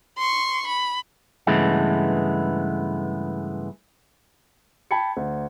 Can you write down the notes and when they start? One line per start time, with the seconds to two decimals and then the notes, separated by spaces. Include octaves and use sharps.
0.18 C6 C#6
0.67 B5
1.47 G2 C#3 E3 G#3 A3 B3
4.91 G5 A5 B5 G#6 C#7
5.17 D2